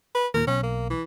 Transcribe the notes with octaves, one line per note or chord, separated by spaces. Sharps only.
B4
D#2 A#2 A#4
B1 C#4
A#3
E3